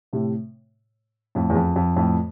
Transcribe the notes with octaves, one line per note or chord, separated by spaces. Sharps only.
A2 C3
F2 A2
E2
F2
F2
F2 A2